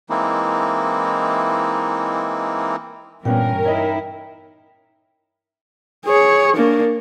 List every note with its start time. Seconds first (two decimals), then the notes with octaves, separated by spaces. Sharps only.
0.10 E3 G#3 A#3 C4 D#4 E4
3.25 G2 A#2 E3 B3 C#4 A#4 G5
3.65 D#4 E4 C#5 D#5
6.06 G#4 C#5
6.56 A#3 D4